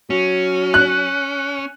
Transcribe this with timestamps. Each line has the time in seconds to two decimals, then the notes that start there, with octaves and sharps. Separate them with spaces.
0.10 F#3 C#4
0.74 F#6